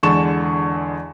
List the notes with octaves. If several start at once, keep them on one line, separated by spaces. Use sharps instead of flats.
E2 D3 G#3 A5 C#6 E7